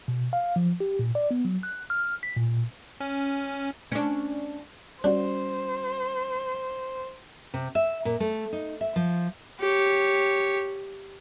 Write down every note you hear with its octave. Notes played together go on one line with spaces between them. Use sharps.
B2
F5
F3
G4
A#2
D5
B3
F#3
F#6
F6
B6
A#2
C#4
C#4 D4
G3 C#4 D4 F#4 C5
C3
E5
A#2
A3
D#4
E5
F3
G4 C#5